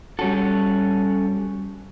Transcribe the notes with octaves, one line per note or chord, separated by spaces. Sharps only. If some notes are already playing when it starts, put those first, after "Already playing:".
G3 C#4 F#4 A4